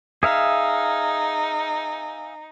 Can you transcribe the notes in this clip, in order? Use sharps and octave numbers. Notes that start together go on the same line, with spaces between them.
D#4 G#4 E5 F5